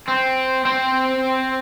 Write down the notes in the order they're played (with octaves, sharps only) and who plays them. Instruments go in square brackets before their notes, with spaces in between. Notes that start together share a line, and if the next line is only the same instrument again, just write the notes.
[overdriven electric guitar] C4
C4